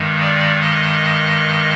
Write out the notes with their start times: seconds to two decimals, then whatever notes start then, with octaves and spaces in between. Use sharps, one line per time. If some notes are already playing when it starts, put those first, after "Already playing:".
Already playing: G2 D#3 G#3
0.20 D5
0.62 D#5